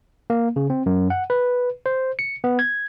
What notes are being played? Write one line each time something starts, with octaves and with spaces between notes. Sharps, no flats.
A#3
C#3
C4
F#2
F#5
B4
C5
C#7
B3
G#6